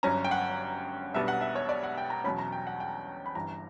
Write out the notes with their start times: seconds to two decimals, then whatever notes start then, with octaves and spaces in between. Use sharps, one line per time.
0.03 G1 G2 F#3 C#4 A#5
0.24 G5
0.31 F#5
1.14 B1 B2 G3 B3 D4 E5
1.28 F#5
1.41 E5
1.55 C#5
1.69 D5
1.83 F#5
1.97 G5
2.10 A#5
2.24 E2 B2 F#3 C#4 B5
2.38 A#5
2.52 G5
2.67 F#5
2.80 G5
3.26 B5
3.35 G1 G2 E3 A#5